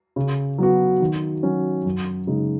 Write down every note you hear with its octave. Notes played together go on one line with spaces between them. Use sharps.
C#3
F#3 B3 F#4
D#3
F#3 C#4
F#2
C#3 G#3 D#4